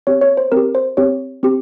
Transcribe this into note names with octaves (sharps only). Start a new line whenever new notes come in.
C4 G4 C#5
C#5
C5
C4 G4 A#4
C5
C4 G4 C#5
C4 G4